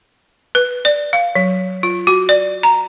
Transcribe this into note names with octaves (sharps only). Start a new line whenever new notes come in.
B4
D5
F5
F#3
F4
F#4
D5
A#5